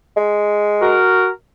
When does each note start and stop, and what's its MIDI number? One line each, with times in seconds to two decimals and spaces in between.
0.17 0.99 56
0.81 1.29 66
0.81 1.29 70